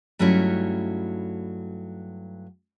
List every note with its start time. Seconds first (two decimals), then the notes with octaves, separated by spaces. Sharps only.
0.19 G2 F#3 A3 C#4 D#4 E4